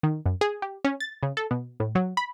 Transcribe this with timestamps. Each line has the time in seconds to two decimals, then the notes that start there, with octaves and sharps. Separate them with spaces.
0.03 D#3
0.26 F#2
0.41 G#4
0.62 G4
0.84 C#4
1.00 A6
1.23 C#3
1.37 A4
1.51 B2
1.80 A2
1.95 F#3
2.17 B5